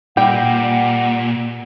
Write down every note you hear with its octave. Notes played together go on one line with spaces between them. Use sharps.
A#2 G3 F#5 G5